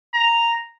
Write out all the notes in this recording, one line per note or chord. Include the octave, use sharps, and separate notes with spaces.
A#5